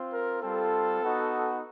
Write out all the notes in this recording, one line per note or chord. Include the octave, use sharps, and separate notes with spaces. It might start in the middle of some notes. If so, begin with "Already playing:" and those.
Already playing: C4 F4
A#4
G3 C4 F4 A4
B3 D#4 F#4